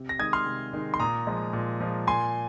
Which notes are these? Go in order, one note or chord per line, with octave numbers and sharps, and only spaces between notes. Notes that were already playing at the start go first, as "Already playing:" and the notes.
Already playing: C3
A#6
D#3 G#3 D#6 G#6
C6 F6
C3
D#3 G#3
C6
A#2 A#5 D#6
F3 G#3
A#2
F3 G#3
A#2 G#5 C6